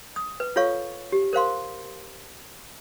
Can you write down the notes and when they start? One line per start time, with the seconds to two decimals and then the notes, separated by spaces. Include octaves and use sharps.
0.16 D#6
0.40 B4
0.56 F4 A4 C#5 F5 C#6
1.12 G4
1.33 A#4 C5 F5 C6